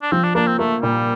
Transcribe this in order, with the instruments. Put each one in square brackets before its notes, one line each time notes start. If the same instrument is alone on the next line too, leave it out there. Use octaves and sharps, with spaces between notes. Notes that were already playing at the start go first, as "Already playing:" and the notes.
[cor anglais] D4
[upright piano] F3 [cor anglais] C4
[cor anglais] D4
[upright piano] A#3 [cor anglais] D4
[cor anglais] C4
[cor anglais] A3 [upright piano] A#3
[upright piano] A#2 [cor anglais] G3